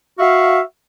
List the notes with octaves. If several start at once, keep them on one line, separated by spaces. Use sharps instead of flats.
F#4 E5 F5